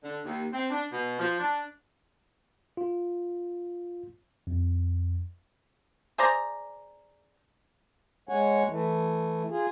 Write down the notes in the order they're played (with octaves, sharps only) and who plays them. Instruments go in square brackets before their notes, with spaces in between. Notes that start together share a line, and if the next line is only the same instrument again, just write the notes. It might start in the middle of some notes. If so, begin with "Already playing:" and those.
[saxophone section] D3
D#2
C4
D4
B2
F3
D4
[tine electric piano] F4
F2
[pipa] G#4 C5 D5 A#5
[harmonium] G#3 C#5 F#5 G#5
E3 A3
F4 G#4